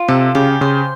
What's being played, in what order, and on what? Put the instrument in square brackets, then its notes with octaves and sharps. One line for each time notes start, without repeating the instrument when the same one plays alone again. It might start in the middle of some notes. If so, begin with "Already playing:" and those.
Already playing: [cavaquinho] F4
[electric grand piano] C3 [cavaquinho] A4
[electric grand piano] C#3 [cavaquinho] G4
[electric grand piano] C#3 [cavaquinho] C5